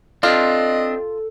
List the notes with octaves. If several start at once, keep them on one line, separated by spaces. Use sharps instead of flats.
C4 D4 F4 A4 D#5